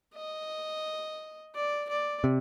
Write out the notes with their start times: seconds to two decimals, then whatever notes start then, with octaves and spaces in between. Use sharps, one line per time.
0.15 D#5
1.55 D5
1.89 D5
2.24 C3